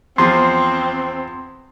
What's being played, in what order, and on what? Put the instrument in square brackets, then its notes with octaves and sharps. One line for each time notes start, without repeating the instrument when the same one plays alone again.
[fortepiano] E2 F3 [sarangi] C4 [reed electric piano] C6